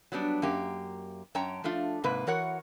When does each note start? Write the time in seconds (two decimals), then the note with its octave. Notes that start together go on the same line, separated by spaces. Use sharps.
0.12 F#3 G3 B3 D4
0.42 F#2 A#3 G4
1.35 F#2 C#5 G5 A5 A#5
1.64 F3 A3 D4 F4
2.04 G#2 C3 A#3 B4
2.27 E3 F#4 A#4 C#5 F#5